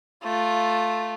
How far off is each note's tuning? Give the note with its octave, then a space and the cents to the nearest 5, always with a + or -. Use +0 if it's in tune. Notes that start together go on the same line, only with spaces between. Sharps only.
A3 +0 F4 +0